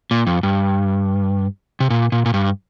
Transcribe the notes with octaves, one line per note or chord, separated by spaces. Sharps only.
A#2
F2
G2
C3
A#2
A#2
A#2
G2